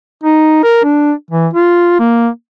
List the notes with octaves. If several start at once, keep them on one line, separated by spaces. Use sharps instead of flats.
D#4
A#4
D4
E3
F4
A#3